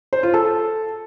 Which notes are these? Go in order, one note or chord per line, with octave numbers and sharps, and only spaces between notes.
C5
F4
A4